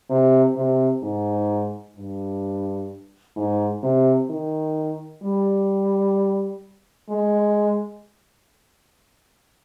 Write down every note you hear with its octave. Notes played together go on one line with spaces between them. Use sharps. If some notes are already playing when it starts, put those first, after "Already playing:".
C3
C3
G#2
G2
G#2
C3
D#3
G3
G#3